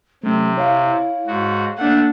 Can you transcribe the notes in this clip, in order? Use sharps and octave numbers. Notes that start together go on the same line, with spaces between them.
C3 F#3 A3 C#4
E4 C#5 F5
G#2 F#4
A3 A#3 D4 F#5